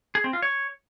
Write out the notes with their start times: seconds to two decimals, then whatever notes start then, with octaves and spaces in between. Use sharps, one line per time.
0.15 G#4
0.24 C4
0.33 F4
0.42 C#5